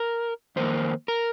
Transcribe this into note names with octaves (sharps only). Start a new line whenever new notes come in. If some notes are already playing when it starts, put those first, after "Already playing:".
Already playing: A#4
F2 D#3 A#3 C5
A#4